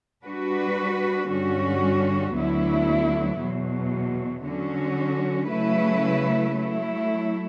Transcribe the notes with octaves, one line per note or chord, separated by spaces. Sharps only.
G3 D4 F#4 B4
G2 D3 G3 C#4 F#4
D2 D3 F#3 B3 E4
E2 B2 F#3
D3 F#3 C#4 F#4
C#3 F#3 A3 E4 B4
F#3 A3 E4